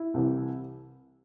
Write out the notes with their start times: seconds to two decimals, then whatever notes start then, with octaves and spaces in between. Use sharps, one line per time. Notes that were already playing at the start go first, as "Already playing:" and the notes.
Already playing: E4
0.14 C2 C3 E3